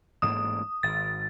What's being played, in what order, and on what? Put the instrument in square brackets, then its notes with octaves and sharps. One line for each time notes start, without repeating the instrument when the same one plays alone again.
[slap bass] A1 G#2 A#3 [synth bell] D#6
[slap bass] G#1 [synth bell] A6